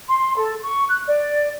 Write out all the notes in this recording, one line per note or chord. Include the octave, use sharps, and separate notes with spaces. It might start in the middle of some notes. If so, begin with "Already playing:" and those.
C6
A4
C#6
F#6
D5